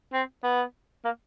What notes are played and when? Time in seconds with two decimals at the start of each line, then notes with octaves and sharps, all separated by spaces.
0.13 C4
0.44 B3
1.05 A#3